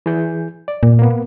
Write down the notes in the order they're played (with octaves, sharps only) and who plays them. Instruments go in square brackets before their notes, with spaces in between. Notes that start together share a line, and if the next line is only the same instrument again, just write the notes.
[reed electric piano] E3 G#4 G6
D5
[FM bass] A#2
[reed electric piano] A#3 B3